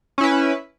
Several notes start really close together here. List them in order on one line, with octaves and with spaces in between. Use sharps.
C#4 E4 B4